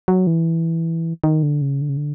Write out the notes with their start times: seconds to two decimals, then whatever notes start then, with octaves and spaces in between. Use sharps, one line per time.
0.08 F#3
0.27 E3
1.24 D#3
1.43 D3
1.62 C#3
1.81 D3
1.89 C#3
1.97 D3